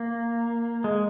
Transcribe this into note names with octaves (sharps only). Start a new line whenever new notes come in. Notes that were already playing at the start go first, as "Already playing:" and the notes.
Already playing: A#3
G#3